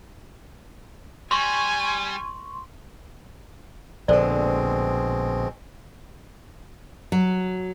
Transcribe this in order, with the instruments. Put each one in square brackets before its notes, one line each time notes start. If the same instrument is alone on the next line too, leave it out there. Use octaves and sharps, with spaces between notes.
[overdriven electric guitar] G3 [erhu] G#5 [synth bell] C6 C#6
[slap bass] A#1 D3 [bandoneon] B2 G#3 C4 [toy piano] A4 C5 D5
[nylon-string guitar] F#3